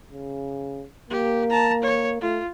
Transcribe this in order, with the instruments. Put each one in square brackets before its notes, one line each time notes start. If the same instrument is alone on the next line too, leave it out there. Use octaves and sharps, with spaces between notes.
[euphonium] C#3
[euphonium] A#3 [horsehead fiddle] G4
[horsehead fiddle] A5 A#5
C#5
[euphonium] A3 [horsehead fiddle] F4